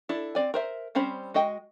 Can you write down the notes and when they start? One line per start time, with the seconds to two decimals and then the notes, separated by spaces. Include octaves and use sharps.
0.09 D4 E4 A4
0.35 C4 D5 G#5
0.54 A#4 C5 E5
0.95 G3 C4 C#4 C5 B5
1.34 G#3 F#4 D#5 G5